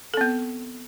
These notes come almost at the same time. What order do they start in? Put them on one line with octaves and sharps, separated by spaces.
A4 C4 B3